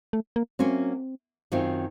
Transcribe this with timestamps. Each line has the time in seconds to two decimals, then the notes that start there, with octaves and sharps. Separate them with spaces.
0.13 A3
0.36 A#3
0.59 F#3 A#3 C4 C#4 F#4
1.52 F#2 D#3 F#3 C4 F4